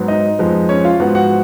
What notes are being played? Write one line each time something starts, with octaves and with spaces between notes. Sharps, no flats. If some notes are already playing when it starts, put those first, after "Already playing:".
Already playing: G#2 F#3 B3
D#4 D#5
F2 F3 G#3 B3
C#4 C#5
F4 F5
G#2 F3 B3 F#4 F#5
F#4 F#5